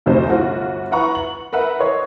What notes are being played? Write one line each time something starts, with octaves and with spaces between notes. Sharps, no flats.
F1 D2 C3 D#4 C5
G1 F4 F#4
E4 B4 F#5 A#5 C#6
F#7
A#4 B4 E5 F#5
C#5 D#5 C6